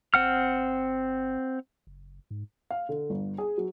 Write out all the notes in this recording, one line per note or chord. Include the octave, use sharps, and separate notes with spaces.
G1 C4 F#5 F6
F#1
G#2
F5
D3
G1
G#4
F#3